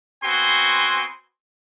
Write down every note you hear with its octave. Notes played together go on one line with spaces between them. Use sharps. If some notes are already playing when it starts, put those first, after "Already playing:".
B3 C4 F#4 G#5 C6